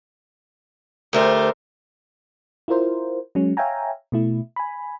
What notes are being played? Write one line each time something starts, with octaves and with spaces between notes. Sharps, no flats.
D2 A3 G4 A#4 C5
E4 F4 A#4 C5
F#3 G#3 C#4
C#5 E5 F5 G5 G#5 A#5
B2 A3 E4
G#5 B5